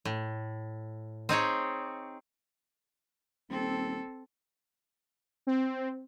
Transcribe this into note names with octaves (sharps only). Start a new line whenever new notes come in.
A2
C4 D#4 G#4 C#5
D#1 C4 A4
C4